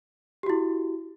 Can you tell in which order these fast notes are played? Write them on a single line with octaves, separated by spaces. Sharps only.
G4 F#4 E4